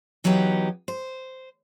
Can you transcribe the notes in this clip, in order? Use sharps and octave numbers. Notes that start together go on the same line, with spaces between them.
E3 F#3 B3 D#4 G4
C5